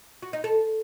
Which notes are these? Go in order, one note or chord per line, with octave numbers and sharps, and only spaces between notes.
F#4
D#4
A4